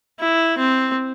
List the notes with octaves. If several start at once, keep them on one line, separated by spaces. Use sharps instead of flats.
E4
C4